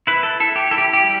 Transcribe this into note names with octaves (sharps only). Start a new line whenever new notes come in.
E4 B4
A4
E4 A4
G4
E4 A4
G4
G4
G3